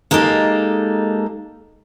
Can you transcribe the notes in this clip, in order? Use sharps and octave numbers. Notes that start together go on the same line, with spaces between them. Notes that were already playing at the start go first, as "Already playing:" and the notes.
G#3 A#3 D#4 G4 A4